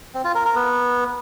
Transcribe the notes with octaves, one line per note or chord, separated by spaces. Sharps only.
C4
F4
A#4
A#4
B3